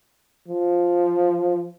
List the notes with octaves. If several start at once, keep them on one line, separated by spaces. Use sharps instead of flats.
F3